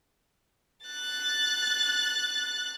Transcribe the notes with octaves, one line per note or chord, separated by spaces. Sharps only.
F#6 A6